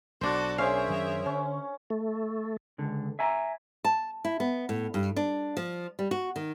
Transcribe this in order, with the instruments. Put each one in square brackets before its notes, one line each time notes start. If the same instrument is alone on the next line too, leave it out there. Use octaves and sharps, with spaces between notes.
[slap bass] B1 [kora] D4 C5 [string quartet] F#4 A4 D6
[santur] C#4 C5 C#5 [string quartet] G#4 A#4 E5 [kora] F5
[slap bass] F#2 D#3 F#3
[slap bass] D3 [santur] C#4
[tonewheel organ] A3
[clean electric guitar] C#2 D3
E5 G#5 A#5
[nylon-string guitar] A5
E4
B3
A2
G2
D4
F3
G3
F#4
D#3